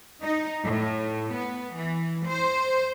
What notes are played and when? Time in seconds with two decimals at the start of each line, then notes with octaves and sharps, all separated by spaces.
0.23 D#4
0.64 A2
1.33 B3
1.74 E3
2.27 C5